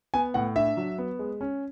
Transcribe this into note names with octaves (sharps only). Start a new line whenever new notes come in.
B3 G#5
A2 F#5
D4 E5
F#3
B3
G#3
C#4